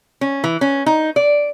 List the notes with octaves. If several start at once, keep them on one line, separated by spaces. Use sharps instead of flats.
C#4
E3
C#4
D#4
D5